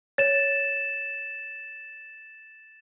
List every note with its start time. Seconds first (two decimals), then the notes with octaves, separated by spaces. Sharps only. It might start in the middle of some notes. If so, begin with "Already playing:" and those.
0.18 C#5 A6 E7